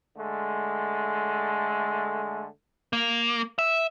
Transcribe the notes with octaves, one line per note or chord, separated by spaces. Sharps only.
D3 G#3 A3
A#3
E5